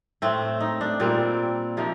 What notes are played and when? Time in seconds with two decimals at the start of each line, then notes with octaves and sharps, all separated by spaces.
0.22 A2 A3 C4
0.61 D#4
0.81 D4
1.00 A#2 G3 A#3 C4
1.77 C3 F3 A#3 D#4